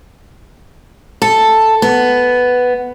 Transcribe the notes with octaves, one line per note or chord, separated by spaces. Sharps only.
A4
B3